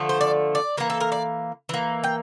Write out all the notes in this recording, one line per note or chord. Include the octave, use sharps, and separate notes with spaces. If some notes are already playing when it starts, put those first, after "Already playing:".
Already playing: D3 F3 A3
C5
D5
D5
E3 A#3 A#4
A4
A#4
D5
E3 A#3
G5